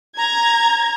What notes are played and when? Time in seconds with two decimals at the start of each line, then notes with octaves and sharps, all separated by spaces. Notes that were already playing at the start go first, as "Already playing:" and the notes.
0.17 A#5 G#6